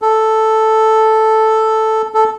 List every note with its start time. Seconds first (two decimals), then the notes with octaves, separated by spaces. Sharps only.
0.02 A4
2.14 A4